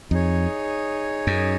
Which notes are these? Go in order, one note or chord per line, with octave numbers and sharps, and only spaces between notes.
F2 D#4 G#4 C#5
F#2